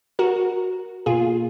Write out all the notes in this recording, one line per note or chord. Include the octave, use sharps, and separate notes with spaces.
F#4 A#4
B2 A#3 F4 G#4